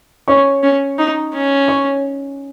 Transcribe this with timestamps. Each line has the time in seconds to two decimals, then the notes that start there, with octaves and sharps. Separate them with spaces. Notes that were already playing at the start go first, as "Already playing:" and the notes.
0.28 C#4 C#5 C#6
0.63 C#4
0.98 D#4
1.34 C#4
1.68 C#5 C#6